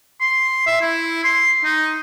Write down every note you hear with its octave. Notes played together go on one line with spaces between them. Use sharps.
C6
E5
E4
C6
D#4